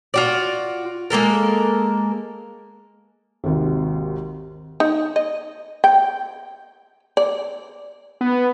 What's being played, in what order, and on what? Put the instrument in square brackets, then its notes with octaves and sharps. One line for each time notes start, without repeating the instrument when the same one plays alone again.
[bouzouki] F4 F#4 D5
G#3 A#3 A4 A#4
[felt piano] G#1 D#2 C3
[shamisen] D#4
D#5
G5
D5
[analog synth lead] B3